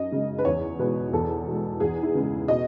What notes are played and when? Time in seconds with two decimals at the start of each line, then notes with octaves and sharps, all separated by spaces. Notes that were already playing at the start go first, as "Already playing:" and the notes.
Already playing: F#2 D#5
0.12 C#3 G#3
0.39 B4
0.45 E2 C#5
0.79 B2 G#3 B4
1.13 E2 A4
1.47 B2 G#3
1.80 E2 G#4
2.03 E4
2.15 C#3 E3 G#3
2.48 B2 D#5